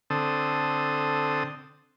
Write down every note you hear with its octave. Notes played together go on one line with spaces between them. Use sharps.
D3 C4 A4 D#6